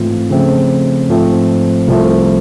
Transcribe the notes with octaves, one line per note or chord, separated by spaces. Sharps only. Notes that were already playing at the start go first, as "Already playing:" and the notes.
Already playing: G#2 E3 A3 C4 F4
C#3 F3 A3 C4
G#2 F3 A3 C4
C2 C3 F3 A3